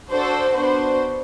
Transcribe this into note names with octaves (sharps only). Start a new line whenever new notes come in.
D4 F#4 A4 C5
B3 D4 F#4 C5